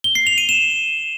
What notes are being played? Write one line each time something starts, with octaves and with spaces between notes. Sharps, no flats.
G7
C7
F7
D#7
E7